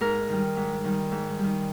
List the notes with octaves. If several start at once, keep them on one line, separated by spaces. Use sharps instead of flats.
G#2 A#4
D#3 G3
G#2
D#3 G3
G#2
D#3 G3